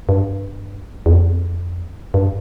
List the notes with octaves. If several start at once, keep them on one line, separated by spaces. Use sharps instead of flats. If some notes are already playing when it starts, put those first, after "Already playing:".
G2
E2
F2
G2